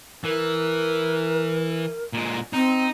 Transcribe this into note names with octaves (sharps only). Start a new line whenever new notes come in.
E3 A#4
A#2 G#3
C4 D#4